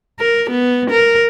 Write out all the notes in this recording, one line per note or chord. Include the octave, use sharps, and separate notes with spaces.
A#4
B3
A#4